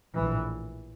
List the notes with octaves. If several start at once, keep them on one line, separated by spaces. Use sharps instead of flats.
A#1 A2 E3